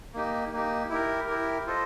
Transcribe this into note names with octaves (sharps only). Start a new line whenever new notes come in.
A#3 D#4 G4
A#3 D#4 G4
E4 G4 A#4
E4 G4 A#4
F4 A4 C5 D#5